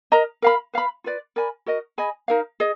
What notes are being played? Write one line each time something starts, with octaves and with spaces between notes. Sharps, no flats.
A#4 D#5 A#5
A#4 F5 B5
B4 F5 B5
F4 B4 D5
A#4 D5 G#5 B5
F#4 A#4 D#5
G#4 D#5 G#5 B5
D#4 A#4 F5
G#4 D#5